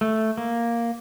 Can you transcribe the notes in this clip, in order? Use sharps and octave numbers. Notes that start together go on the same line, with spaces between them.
A3
A#3